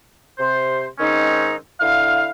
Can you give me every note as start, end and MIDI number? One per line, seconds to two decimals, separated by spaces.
0.38 0.86 48
0.38 0.86 72
0.99 1.54 44
0.99 1.54 51
0.99 1.54 60
0.99 1.54 61
0.99 1.54 63
1.80 2.28 50
1.80 2.28 64
1.80 2.28 77